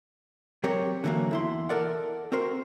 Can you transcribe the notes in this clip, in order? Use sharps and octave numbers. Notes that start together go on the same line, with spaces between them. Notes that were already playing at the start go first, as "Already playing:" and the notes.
F#3 C4 G4 A#4 C#5
D3 E3 F#3 G#3 A#3
E2 E4 C6
A4 A#4 D5 F#5
C4 F#4 A#4 C5